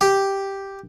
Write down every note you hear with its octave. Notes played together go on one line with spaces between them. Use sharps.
G4